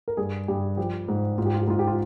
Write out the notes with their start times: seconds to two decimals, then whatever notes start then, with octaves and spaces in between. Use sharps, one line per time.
0.08 A#4
0.17 G2 G#4
0.48 G2 G4
0.77 F3 G4
1.08 G#2
1.38 G#2 F4
1.46 G4
1.54 F4
1.62 G4
1.67 G#2 F4
1.79 G4
1.87 F4